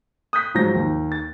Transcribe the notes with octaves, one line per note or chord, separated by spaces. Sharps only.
D#6 F#6 G6 B6
G#2 F3 F#3 C5 G6 A#6
D#2
A6